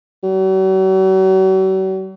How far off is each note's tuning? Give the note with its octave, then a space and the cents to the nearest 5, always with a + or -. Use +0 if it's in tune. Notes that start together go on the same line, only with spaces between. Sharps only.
F#3 +45